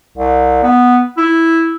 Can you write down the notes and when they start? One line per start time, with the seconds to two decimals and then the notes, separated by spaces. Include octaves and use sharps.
0.17 C2
0.63 B3
1.17 E4